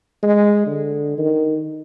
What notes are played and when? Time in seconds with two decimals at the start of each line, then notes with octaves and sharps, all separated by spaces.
0.23 G#3
0.66 D3
1.18 D#3